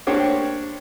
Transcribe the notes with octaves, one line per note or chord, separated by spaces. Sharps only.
A#3 D4 G4 C5 C#5